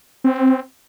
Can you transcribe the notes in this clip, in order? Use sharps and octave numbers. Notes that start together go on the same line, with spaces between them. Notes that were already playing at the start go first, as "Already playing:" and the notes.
C4